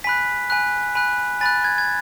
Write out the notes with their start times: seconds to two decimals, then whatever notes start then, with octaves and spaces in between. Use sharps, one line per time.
0.04 G#5 B5 F#6 B6
0.50 G#5 B5 F#6
0.95 G#5 B5 F#6
1.41 G#5 B5 F#6 A6
1.64 G#6
1.78 G#6